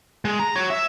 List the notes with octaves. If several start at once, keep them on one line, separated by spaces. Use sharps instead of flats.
G#3
A#5
F#4 C#5
E5